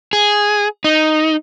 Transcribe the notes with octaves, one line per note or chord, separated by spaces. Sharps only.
G#4
D#4